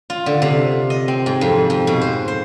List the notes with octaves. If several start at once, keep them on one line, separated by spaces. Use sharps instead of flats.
F4
D3
C3
D#5
C4
G#2
F2
F2
B2
C5
C5